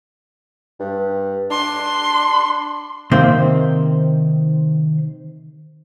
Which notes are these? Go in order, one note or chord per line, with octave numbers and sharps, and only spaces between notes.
G2
D4 C6
C3 D#3 A#3 C4 C5